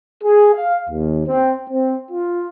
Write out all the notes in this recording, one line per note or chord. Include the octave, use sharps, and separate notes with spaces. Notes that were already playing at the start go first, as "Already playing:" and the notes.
G#4
F5
D#2
C4
C4
F4